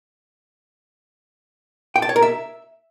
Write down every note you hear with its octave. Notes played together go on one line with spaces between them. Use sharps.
G5
A5
C#5
A#4
E5